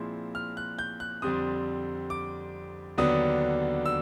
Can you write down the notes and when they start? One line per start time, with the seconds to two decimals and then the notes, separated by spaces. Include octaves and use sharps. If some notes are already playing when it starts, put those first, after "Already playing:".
Already playing: A#2 F3 G#3 C4 E4
0.35 F6
0.57 F#6
0.79 G6
1.00 F#6
1.22 F2 D3 G3 C4 D#6
2.10 D6
2.98 D#2 D3 F#3 B3 D4 D#6
3.86 E6